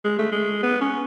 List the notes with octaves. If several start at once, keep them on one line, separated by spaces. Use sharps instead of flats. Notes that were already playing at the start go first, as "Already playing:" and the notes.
G#3
A3
G#3
B3
C#4